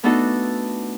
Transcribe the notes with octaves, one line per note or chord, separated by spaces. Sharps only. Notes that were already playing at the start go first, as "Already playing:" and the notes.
A3 B3 D4 D#4 F#4 A4